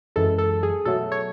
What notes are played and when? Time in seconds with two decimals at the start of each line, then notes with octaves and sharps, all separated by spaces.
0.16 F#2 E3 G#3 A4
0.38 A4
0.63 G#4
0.85 B2 F#3 A3 A4
1.12 C#5